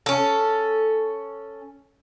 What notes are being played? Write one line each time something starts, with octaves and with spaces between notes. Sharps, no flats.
C#4 A4